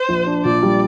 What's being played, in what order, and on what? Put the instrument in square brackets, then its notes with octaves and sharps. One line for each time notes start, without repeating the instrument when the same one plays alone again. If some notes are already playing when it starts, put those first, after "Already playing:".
Already playing: [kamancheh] C5
[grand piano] A#1
D4
[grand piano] A#2 [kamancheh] D5
[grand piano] G3